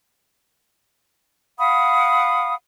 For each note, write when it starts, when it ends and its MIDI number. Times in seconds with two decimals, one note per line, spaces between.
1.59 2.55 77
1.59 2.55 78
1.59 2.55 83
1.59 2.55 87